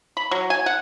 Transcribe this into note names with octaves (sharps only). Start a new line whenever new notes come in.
B5
F#3
G#5
F#5